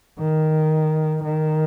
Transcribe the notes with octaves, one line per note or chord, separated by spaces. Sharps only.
D#3
D#3